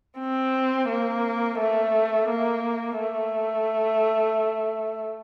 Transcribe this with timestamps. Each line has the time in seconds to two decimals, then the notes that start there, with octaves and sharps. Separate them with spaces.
0.18 C4
0.89 A#3
1.59 A3
2.29 A#3
3.00 A3